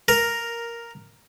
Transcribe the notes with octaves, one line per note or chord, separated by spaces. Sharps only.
A#4